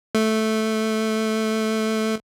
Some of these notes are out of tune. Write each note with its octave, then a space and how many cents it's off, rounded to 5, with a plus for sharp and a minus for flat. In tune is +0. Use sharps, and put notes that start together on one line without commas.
A3 -5